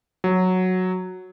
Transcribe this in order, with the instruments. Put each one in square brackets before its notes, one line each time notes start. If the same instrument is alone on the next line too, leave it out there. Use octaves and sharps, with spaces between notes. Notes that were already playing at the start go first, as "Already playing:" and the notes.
[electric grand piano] F#3